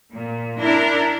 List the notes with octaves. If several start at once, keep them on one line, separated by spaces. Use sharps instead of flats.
A#2
D4 E4 A#4